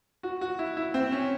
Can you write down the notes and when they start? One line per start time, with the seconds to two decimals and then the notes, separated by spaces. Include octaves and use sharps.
0.23 F#4
0.41 F#4
0.59 E4
0.77 E4
0.94 C4
1.12 C#4